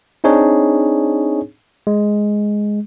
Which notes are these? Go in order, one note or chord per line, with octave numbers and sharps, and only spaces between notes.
C4 D4 D#4 G#4 C#5
G#3